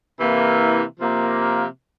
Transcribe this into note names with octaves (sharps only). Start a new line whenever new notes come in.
C3 E3 A#3 E4
C3 F3 A#3